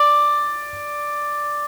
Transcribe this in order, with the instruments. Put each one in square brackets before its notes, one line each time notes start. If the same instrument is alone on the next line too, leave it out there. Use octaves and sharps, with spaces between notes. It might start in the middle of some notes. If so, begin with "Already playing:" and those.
Already playing: [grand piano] D5